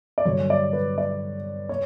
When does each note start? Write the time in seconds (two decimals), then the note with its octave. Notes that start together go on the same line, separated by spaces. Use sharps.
0.18 D5
0.25 G2 D3 F#3 C#5
0.50 D5
0.73 B4
0.98 D5
1.69 C#5